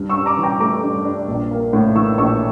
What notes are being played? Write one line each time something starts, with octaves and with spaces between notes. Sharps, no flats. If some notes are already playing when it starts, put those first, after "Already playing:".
Already playing: G2
C#6 E6
D4
A#5 D6
E3
G5 A#5
A3 A#5 D6
G2
D4
A#1
A#3
A2
E3 C#6 E6
A#1 C#6 E6